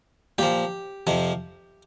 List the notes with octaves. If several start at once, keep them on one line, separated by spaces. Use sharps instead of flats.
A#2 F3 G4
F2 C3 F3